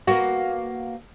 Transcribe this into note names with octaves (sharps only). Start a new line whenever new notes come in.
A#3 B3 F#4